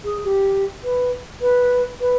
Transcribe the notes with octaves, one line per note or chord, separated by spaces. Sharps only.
G#4
G4
B4
B4
B4